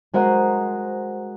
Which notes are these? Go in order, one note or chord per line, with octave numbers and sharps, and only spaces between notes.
G#3 F#4 A#4 C5 D#5 F#5